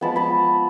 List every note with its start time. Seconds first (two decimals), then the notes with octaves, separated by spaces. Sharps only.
0.01 F3 G#3 B3 A5 B5
0.16 A5 B5